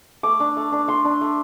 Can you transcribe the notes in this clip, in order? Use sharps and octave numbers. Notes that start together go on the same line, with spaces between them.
A3 D6
D4
A3
D4
A3 C6
D4
A3